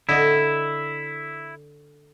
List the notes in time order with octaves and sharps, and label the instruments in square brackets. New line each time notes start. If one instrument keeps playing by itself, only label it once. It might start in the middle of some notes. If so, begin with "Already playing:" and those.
[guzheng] D3 D#5 [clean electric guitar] E4